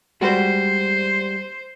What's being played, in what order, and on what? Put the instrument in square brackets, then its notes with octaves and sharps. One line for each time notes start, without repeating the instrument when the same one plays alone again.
[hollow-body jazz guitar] G3 G#3 F#4 [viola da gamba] C5